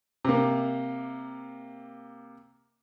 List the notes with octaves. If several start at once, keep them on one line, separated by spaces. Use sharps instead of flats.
C3 A#3